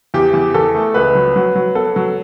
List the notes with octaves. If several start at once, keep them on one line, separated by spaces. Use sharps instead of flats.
E2 G4
E2
E2 A4
A3
C#2 B4
F#3
F#3
F#3
B3 A4
F#3